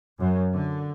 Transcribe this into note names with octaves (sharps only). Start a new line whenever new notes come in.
F#2
D3